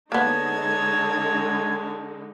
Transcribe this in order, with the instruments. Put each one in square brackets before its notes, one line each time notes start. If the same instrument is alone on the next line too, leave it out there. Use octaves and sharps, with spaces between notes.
[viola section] D3 G#3 D#4 [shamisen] A#3 B3 [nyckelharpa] C#5 A5 [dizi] G#6